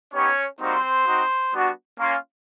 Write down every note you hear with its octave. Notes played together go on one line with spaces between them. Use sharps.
B3 C#4 D#4 G4 C#5
G3 A#3 C4 D#4 F#4 C5
C4 D#4 F#4
G3 B3 D4 F#4
A#3 C#4 F4